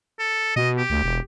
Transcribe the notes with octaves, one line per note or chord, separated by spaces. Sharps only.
A4
B2 D#5
G4
D2
E1